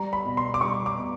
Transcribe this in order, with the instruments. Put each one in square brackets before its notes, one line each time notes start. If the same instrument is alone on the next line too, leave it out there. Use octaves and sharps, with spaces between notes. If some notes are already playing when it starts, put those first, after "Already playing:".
Already playing: [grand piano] G3 A#5
B5
B2
C6
D6
G3 C#6
D6
B2